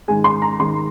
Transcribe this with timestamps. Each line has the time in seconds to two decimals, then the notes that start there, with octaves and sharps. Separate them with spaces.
0.08 G#2 D#3 G#3 G#5
0.24 C6
0.42 A#5
0.59 G#2 D#3 G#3 C6